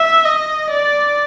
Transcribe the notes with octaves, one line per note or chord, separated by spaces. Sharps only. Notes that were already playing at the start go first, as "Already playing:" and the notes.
Already playing: E5
D#5
D5